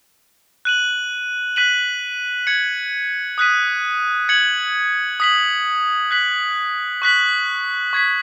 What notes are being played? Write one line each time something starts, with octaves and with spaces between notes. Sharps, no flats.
F#6 D#7 F#7
F#6 B6 D#7 F#7
G#6 C#7 F#7
D#6 F#6 B6 D#7
G#6 C#7 F#7
D#6 B6 F#7
F#6 B6 F#7
C#6 F#6 B6 F#7
C#6 G#6 B6